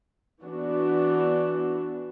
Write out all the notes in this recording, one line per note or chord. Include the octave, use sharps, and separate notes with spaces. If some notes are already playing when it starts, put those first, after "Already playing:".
E3 B3 D4 F#4